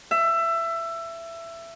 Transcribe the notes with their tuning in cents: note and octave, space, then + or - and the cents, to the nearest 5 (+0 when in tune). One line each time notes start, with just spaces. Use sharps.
E5 +20